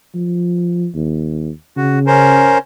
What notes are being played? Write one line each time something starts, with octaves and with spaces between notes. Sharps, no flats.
F3
D#2
C#3 F#4
C#4 A#4 C5